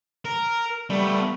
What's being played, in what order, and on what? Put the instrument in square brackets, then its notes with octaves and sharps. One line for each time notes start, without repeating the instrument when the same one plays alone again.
[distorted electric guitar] A#4
[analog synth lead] G3 [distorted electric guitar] A3 B3